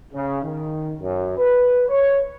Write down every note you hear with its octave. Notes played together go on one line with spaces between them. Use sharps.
C#3
D#3
F#2
B4
C#5